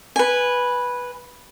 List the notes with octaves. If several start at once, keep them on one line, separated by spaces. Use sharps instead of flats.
B4 G#5